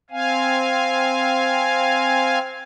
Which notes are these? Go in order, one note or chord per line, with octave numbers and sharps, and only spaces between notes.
C4 F5 G#5